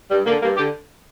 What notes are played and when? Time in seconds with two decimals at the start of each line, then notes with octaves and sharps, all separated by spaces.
0.10 G2 G3
0.26 D3 A#3
0.41 G2 A#3
0.57 D3 G4